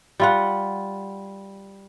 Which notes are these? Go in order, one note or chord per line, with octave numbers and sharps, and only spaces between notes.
G3 F4 F#5